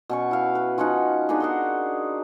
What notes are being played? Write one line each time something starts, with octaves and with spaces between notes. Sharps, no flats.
B2 C#4 C#6
E4 F5
B4
F3 C#4 D#4 F#5
B3 D4 D#4 G#4
F#4 A#4 C6